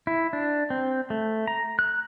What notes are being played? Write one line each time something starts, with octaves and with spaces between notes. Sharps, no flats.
E4
D4
C4
A3
A#5
F#6